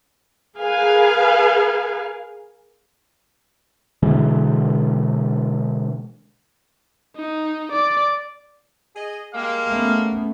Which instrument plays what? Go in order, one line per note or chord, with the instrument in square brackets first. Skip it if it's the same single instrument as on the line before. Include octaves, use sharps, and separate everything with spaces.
[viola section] G#4 A#4 B4 F5 G#5
[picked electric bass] B2 D3 E3 G#3
[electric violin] D#4
D5
[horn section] G#4 D#5
[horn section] G3 G#3 A#3 [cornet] F5
[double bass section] A3 B3 C#4